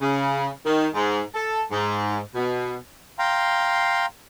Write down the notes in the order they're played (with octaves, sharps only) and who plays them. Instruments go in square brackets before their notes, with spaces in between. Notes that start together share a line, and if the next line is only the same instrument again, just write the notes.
[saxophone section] C#3
D#3
G#2
A4
G#2
B2
[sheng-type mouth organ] F5 G5 A#5 C6